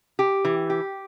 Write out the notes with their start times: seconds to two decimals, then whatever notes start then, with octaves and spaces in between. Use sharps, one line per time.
0.19 G4
0.45 E3
0.70 G4